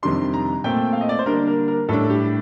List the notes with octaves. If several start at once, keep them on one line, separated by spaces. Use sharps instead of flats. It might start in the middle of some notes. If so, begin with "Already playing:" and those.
F2 C3 D#3 G3 D4 C6
A#5
A#2 A3 C4 G5
F5
D#5
D5
C5
D3 G3 A#3 D4 A#4
A#4
A#4
A2 G3 D4 A4
G4